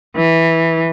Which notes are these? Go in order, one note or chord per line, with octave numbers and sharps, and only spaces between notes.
E3